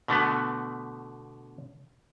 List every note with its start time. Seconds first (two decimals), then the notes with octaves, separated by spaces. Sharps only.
0.08 B2 D3 A3 B3